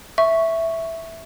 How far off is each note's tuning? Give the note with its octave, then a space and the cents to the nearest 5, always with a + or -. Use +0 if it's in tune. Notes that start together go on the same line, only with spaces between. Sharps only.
E5 +0 C#6 +0